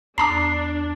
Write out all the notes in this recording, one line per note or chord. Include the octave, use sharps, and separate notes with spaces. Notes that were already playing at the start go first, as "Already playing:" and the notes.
E2 D4 A5 A#5 D6 C7